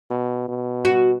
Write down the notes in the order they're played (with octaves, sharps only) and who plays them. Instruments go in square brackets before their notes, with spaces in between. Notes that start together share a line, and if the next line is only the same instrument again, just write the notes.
[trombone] B2
B2
[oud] F#4